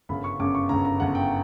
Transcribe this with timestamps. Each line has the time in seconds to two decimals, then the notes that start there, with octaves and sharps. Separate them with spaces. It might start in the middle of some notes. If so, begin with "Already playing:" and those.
0.09 G1 F#2 C#3 B5
0.24 C#6
0.39 G1 F#2 C#3 D6
0.55 C#6
0.69 G1 F#2 C#3 A#5
0.85 A#5
1.00 G1 F#2 C#3 F#5
1.15 G5